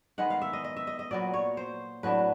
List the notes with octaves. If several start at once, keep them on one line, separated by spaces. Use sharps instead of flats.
D#3 G#3 B3 F#5
F5
E5
D#5
D#5
E5
D#5
D#5
A#2 F#3 B3 D5
C#5
C5
A2 F#3 B3 D4 B4